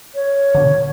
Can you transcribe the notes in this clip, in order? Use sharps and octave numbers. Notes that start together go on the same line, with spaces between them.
C#5
B2 D3